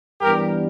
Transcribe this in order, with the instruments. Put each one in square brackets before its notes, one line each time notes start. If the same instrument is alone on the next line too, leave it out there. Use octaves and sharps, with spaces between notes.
[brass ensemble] G2 E3 G3 B3 G4 A#4